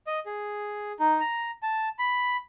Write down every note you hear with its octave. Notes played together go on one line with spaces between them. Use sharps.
D#5
G#4
D#4
A#5
A5
B5